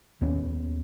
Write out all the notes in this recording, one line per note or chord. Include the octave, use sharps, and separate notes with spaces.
D#2 B3 C#4